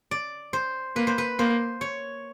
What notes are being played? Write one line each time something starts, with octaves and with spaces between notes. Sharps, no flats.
D5
C5
A#3 B4
C5
B4
A#3 C5
C#5